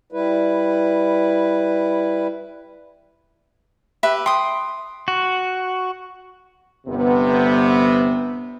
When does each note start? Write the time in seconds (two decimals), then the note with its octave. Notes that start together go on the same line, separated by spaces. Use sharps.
0.12 G3 E4 B4
4.03 G4 B4 E5
4.26 G5 C6 D#6
5.08 F#4
6.87 G1 C3 B3